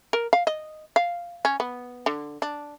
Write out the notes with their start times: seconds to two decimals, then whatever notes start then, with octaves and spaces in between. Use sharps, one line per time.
0.13 A#4
0.33 F5
0.47 D#5
0.96 F5
1.45 C#4
1.60 B3
2.06 D3
2.42 D4